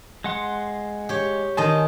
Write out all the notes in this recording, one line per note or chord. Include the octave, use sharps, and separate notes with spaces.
G#3 F#5 C6
G4 C#5
D#3 D#5 G#5 A5 C6